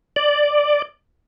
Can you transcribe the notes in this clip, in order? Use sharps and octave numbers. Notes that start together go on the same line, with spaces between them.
D5